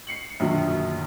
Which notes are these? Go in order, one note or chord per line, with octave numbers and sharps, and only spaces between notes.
C7 C#7 F#7
A#1 F#2 B2 D3 D#3